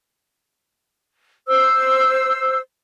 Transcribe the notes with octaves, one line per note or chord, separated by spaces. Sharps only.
C5 E6